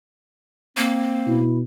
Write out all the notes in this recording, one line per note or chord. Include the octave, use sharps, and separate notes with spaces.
A#3 C4
B2 E4